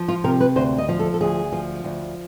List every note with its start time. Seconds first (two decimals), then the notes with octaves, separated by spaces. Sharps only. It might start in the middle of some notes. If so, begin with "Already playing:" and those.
Already playing: F3
0.08 F4
0.24 C3 A#4
0.40 B4
0.56 D2 C5
0.78 D#5
0.89 F3
0.99 A4
1.14 A4
1.21 D2 G#4
1.52 F3
1.84 D2